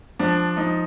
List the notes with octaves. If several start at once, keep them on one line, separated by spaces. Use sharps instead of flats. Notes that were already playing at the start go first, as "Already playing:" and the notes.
F3 D4
F3 D#4